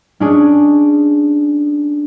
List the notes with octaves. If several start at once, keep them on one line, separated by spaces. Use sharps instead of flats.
C#4 D4 G#4